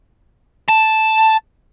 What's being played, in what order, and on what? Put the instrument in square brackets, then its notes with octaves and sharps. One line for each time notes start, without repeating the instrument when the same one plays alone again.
[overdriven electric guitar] A5